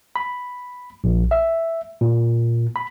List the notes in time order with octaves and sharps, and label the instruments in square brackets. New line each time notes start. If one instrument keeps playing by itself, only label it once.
[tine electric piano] B5
A#1
E5
A#2
B5